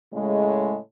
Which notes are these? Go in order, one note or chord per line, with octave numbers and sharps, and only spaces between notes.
A2 C#3 G#3